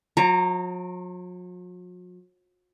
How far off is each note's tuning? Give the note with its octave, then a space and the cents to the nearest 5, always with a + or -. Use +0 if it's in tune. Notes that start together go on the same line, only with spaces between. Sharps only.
F#3 -45 A#5 -15